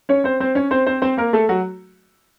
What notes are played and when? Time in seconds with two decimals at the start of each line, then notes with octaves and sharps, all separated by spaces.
0.09 C#4 C#5
0.24 C4 C5
0.40 C4 C5
0.55 C#4 C#5
0.71 C4 C5
0.86 C4 C5
1.02 C4 C5
1.17 A#3 A#4
1.33 A3 A4
1.49 F#3 F#4